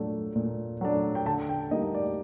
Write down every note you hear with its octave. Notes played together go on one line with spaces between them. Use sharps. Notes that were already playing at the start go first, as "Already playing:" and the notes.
Already playing: A#2 F#3 A3 D4
A#2
F#3 A3 D4
G5
D3 A5
G5
G3 A#3 D#4 D#5
D5